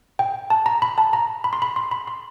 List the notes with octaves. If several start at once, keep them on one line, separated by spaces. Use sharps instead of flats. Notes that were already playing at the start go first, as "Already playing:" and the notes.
G5
A5
A#5
B5
A5
A#5
B5
C6
B5
C6
B5
C6